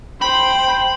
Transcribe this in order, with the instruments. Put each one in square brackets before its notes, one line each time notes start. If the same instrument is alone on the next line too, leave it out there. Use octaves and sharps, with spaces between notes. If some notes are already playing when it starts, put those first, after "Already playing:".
[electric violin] C5 G5 [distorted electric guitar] B5